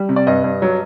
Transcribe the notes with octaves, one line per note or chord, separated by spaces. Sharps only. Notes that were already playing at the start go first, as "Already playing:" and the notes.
Already playing: G3
C3
D5
G2 D#5
G2
F#3